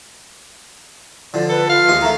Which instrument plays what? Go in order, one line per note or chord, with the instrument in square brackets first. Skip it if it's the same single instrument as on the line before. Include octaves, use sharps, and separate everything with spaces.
[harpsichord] D3 F3 [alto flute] D5
[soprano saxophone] A4 [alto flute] B4
[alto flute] F4 [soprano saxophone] F5
[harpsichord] D#2 G#3 D#6
[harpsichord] D#3 A3 [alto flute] A#5